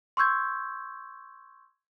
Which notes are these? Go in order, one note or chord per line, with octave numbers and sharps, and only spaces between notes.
C6 C#6 E6 G6 G#6